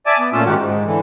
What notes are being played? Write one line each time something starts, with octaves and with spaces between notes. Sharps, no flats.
D5 E5 G#5 A5 D6
B3
A#2 A3 C#4 F4 E6
G#2 D#3 G#3 F#4 G4
G#2
D3 E3